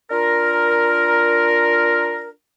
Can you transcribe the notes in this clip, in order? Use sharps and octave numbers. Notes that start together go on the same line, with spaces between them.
D4 F4 A#4